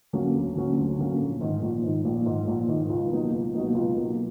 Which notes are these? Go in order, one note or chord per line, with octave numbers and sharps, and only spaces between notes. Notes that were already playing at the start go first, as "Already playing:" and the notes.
D3 F#3 A#3 C#4
D2
D3 F#3 A#3 C#4
D2
D3 F#3 A#3 C#4
A#1
G#2 D#3
A#1
G#2 D#3
A#1
G#2 D#3
A#1
G#2 D#3
C#2
B2 F#3 A#3 D#4
C#2
B2 F#3 A#3 D#4
C#2
B2 F#3 A#3 D#4